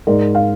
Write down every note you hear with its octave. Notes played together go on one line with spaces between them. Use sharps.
G#2 A#4 D5
F5